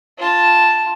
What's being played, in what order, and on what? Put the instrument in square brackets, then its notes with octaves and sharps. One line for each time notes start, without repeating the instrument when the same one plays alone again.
[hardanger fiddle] F4 A5